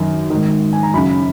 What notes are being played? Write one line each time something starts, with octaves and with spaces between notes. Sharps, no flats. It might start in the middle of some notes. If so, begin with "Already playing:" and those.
Already playing: F#2 D#3
D#3
G#2
G#5
A#5
F#2 C#3 B5